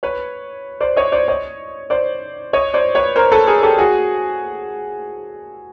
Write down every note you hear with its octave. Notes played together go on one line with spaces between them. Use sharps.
B4 C#5
C5 D5
C#5 D#5
C5 D5
C#5 D#5
C5 D5
C#5 D#5
C5 D5
B4 C#5
A#4 C5
A4 B4
G#4 A#4
G4 A4
F#4 G#4